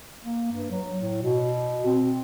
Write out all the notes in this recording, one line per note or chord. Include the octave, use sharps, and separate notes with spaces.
A#3
G2
F#3
A2
B2
C4